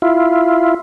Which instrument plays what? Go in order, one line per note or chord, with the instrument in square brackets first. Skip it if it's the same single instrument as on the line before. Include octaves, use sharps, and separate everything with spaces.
[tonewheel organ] E4 F4